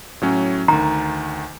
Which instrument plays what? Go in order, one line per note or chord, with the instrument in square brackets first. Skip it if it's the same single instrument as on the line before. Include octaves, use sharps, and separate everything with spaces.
[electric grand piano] A2 F#3 C#4
[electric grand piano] D2 D#3 [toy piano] A#5